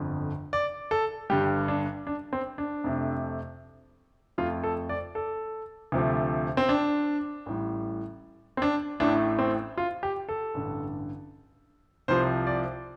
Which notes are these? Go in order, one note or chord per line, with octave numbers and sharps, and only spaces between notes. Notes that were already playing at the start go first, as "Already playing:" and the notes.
Already playing: G1 F2 D3 F3
D5
A4
G1 G2 G3 G4
D4
D4
C4
D4
F2 C3 A3
F2 F3 A3 F4
A4
D5
A4
D2 C3 F3 A3
C4
D4
A1 A2 G3
C4
D4
A1 A2 A3 D4
C4
F4
G4
A4
A1 G2 D3
C2 C3 F3 C5
D5